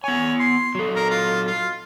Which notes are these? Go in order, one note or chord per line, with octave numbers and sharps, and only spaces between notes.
B3 C#5 G#5
C6
F#3 A4
A#4
F4
F4